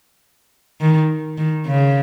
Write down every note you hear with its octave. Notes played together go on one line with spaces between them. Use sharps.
D#3
D#3
C#3